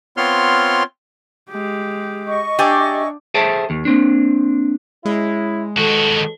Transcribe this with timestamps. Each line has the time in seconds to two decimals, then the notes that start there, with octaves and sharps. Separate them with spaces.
0.17 B3 C4 F4 C#5 C6 F6
1.50 G#3 G4
2.27 D#5 C#6
2.59 D4 G4 G#4 D5 E5
3.34 G#4 A4 C5 E5 G5 A5
3.70 D#2
3.85 A#3 C4 D4
5.05 G#3 C#4 E4
5.78 B1 D#3 F#4 A4